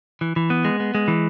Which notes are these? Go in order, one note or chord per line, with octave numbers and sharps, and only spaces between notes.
E3
E3
B3
G#3
B3
G#3
E3